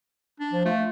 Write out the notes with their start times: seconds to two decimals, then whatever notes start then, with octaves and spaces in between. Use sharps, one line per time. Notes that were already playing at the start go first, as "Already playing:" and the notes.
0.40 D4
0.53 F3
0.65 A3 F4